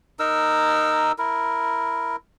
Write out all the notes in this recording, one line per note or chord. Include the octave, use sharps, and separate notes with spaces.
D#4 A#4 E6
E4 A#4